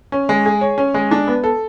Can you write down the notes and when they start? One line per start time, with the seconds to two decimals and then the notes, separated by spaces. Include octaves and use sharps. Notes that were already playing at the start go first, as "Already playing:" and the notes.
0.12 C#4
0.29 G#3
0.46 G#4
0.61 C#5
0.78 C#4
0.94 G#3
1.11 D4
1.27 B3
1.44 A4